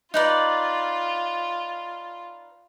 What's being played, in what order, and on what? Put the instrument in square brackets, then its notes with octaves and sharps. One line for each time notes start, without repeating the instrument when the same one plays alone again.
[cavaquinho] D#4 B4 D5 [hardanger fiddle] F4